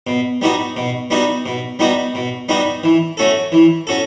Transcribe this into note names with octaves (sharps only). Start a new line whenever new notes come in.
B2
G3 B3 D#4 F#4
B2
G3 B3 D#4 F#4
B2
G3 B3 D#4 F#4
B2
G3 B3 D#4 F#4
E3
A3 C#4 F#4 A4
E3
C#4 F#4 A4